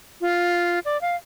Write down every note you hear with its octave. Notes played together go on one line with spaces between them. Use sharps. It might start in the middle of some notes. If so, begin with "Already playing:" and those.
F4
D5
F5